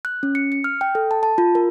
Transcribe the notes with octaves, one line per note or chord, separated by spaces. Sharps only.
F#6
C#4
C#7
C#7
F6
G5
A4
A5
A5
F4
A#4